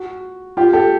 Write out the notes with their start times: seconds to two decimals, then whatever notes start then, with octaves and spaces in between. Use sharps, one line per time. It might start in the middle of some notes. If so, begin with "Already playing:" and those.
Already playing: F#4
0.57 F4 G4
0.73 G4 A4